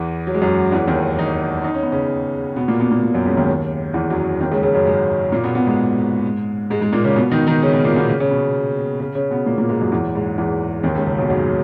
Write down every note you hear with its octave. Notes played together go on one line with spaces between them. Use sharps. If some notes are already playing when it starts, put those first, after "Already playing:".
Already playing: E2 E3
F#3
G#3
F#2 F#3
E2 E3
D#2 D#3
D#3 D#4
D#4
C#4
B3
C#3 C#4
B2 B3
A#2 A#3
B2 B3
A#2 A#3
A#2 A#3
F#2 F#3
C#2 C#3
D#2 D#3
E2 E3
F#2 F#3
D#2 D#3
C#2 C#3
C#2 C#3
F#2 F#3
G#2 G#3
A#2 A#3
B2 B3
B2 B3
G#2 G#3
G#2 G#3
G#2 G#3
A#2 A#3
C#3 C#4
B2 B3
D#3 D#4
D#3 D#4
C#3 C#4
B2 B3
A#2 A#3
B2 B3
C#3 C#4
C#3 C#4
B2 B3
C#3 C#4
C#3 C#4
B2 B3
A#2 A#3
A#2 A#3
G#2 G#3
F#2 F#3
E2 E3
G#2 G#3
E2 E3
D#2 D#3
C#2 C#3
C#2 C#3
B1 B2
F#2 F#3